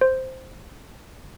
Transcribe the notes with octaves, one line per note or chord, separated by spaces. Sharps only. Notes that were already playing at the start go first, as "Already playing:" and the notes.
C5